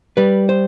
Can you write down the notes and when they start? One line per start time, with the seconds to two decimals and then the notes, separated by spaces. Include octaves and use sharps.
0.17 G3 B4
0.49 C5